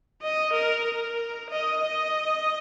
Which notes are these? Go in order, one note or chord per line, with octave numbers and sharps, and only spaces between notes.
D#5
A#4
A#4
D#5
D#5